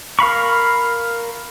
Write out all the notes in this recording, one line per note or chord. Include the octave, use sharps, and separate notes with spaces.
A#4 F5 B5 C#6